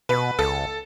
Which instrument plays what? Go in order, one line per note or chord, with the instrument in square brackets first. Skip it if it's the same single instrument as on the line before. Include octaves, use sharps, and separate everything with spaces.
[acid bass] B2 [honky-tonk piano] B4
[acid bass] C#2 [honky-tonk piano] A4